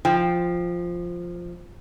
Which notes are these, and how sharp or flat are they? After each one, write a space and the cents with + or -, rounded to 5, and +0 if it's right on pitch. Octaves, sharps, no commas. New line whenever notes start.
F3 +0 G5 +10